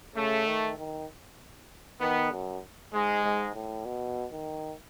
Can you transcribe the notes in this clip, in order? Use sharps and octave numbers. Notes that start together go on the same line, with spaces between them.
C#3 A3
D#3
D#3
D#3 B3
F#2
G#2 G#3
G#2
A2
B2
D#3